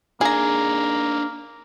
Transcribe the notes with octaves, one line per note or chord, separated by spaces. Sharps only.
A#3 D4 D#4 G#4 A#5